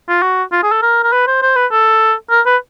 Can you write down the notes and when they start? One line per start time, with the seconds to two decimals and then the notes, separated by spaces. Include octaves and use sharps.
0.09 F4
0.22 F#4
0.52 F4
0.63 G#4
0.72 A4
0.82 A#4
1.04 A#4
1.13 B4
1.27 C5
1.42 C5
1.56 B4
1.72 A4
2.30 A#4
2.46 B4